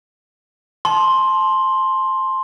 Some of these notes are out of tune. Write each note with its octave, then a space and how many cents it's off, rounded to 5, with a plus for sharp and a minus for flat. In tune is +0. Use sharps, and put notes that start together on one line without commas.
A5 -25 C6 +10